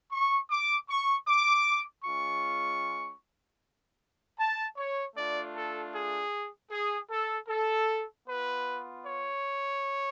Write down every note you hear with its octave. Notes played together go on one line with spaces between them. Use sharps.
C#6
D6
C#6
D6
G#3 C#4 F4 C#6
A5
C#5
A3 D4 F4 D5
A4
G#4
G#4
A4
A4
B3 F4 B4
C#5